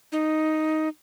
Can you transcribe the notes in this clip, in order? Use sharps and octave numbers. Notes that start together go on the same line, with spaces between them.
D#4